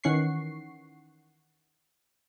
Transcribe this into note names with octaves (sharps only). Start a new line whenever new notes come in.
D#3 E3 C#4 F#5 C#6 C7